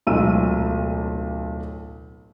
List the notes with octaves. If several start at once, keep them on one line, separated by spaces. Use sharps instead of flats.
D1 B1 G#3 F4 E6 D#7